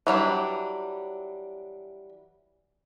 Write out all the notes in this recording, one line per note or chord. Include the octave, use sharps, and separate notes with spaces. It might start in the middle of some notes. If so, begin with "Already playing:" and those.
E3 F#3 G3 D4